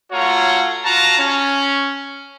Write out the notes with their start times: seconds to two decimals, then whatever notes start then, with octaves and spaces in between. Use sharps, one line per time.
0.13 A3 F4 F#4 C#5 A#5
0.85 F4 F#4 A5 A#5
1.19 C#4